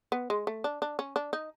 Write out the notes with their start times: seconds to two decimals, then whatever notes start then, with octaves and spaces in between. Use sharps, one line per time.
0.12 B3
0.30 G#3
0.47 A3
0.64 D4
0.82 D4
0.99 C#4
1.16 D4
1.33 D#4